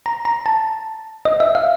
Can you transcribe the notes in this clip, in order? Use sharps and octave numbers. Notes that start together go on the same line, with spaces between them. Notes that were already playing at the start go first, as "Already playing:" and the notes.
A#5
A#5
A5
D#5
E5
F5